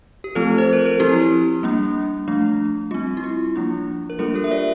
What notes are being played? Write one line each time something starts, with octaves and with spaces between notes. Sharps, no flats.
G4
F3 A3 C4 F4 A4
C5
A#4
A4
F3 C4 E4 G4
G3 A#3 D4
F3 A3 D4
G3 C4 F4
E4
F4
F3 A#3 D4
A#4
G3 A#3 D4 F4 A4
G4 A#4
E5
A#4 D5